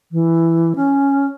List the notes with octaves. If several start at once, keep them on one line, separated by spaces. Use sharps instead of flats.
E3
C#4